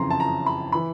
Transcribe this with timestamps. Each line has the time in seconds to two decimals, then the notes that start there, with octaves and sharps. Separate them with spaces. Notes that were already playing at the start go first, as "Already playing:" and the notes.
Already playing: F#1 F2 C#3 E3 A#5 C6
0.10 A5
0.20 A#5
0.46 B5
0.72 E3 B5